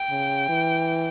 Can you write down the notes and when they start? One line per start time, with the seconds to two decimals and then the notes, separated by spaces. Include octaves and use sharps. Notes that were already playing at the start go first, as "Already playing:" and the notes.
Already playing: G5
0.11 C#3
0.49 E3